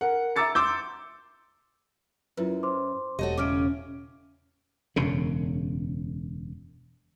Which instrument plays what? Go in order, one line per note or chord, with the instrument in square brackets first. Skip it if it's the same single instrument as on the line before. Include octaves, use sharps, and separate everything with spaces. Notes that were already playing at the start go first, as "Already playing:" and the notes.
[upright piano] A#4 F#5
E5 A#5 D6 E6 A6 C#7
C6 D6 E6 G6
[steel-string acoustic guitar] F#2 [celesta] E4 F4 B4
[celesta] C5 C6 D6
[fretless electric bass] E1 [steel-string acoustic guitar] F#4 A4 D#5 [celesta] G4 C#5
[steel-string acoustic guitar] A2 C#3 C#4 [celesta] D6 F6 D7
[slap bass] E1 F#2 C#3